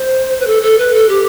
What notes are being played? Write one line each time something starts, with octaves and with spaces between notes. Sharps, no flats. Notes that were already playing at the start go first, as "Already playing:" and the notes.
Already playing: C5
B4
A4
A4
B4
A4
G4